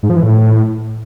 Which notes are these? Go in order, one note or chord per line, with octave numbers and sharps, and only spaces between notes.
G#2
F3
E3
A2